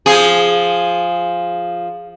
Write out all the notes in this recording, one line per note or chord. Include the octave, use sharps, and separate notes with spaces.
F3 G#4